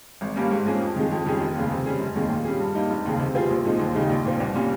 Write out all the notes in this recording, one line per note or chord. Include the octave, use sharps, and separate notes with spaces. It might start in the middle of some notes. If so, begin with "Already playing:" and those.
G#1
G2 G3 A#3 C#4
G#2
F3 A#3 C#4 G#4
F2
D#3 G#3
F2
D#3 G3 C#4 G#4
F1
D#2 C#3
C3
G3 C#4 G#4
F1
D#2 D#3 G#3
A#2
G3 C#4 G#4
G2
G3 A#3 D#4
F1
D#2 C#3
C3
G3 C4 F4 G#4
A#1
A#2 F3 G#3 D#4
D#2
C#3 G#3 D#4 G4
A#1
A#2 F3 C4
C2
A#2 G3 C#4